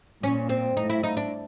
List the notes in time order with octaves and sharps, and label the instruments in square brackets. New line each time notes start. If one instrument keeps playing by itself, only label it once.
[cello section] A#2 [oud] C#4
[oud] C4
[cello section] A2 [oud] D#4
[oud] E4
D#4
D4